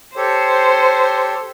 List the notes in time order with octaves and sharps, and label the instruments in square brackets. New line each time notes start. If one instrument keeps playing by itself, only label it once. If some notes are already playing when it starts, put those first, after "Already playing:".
[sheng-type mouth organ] G4 A4 C#5 [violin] C5